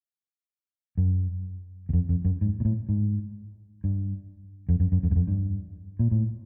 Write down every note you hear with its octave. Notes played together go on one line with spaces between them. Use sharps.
F#2
E2
F2
F2
F#2
G#2
A#2
A2
G#2
G2
F2
F#2
F#2
F2
F#2
F2
G2
A#2
A2